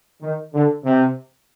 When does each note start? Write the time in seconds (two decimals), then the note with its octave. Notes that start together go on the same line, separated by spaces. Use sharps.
0.21 D#3
0.54 D3
0.84 C3